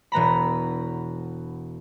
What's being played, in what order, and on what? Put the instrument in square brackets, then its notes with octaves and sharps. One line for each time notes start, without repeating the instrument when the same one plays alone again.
[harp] E1 B3 A#5 B5